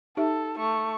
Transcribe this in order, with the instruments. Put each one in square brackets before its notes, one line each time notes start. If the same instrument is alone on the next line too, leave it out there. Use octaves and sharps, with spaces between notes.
[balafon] D#4 G4 E5 [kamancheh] A4
[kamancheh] A3 C#6